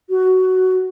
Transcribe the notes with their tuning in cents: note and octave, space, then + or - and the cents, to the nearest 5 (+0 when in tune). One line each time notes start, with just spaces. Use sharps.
F#4 +10